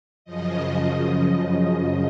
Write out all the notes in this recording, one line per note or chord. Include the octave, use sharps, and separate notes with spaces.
F#2 C#3 F3 D#5